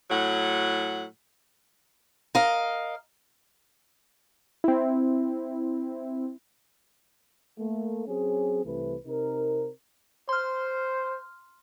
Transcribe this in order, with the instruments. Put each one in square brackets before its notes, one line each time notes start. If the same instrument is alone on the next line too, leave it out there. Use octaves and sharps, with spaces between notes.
[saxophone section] A2 F#3 F#5
[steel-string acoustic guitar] A#4 D#5 F5
[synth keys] C4 E4
[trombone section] A3 A#3
F#3 C4 C#4 G#4
C2 C3 E3 A3 E4 B4
C3 C4 D#4 A#4
[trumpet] C5 [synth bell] C6 F6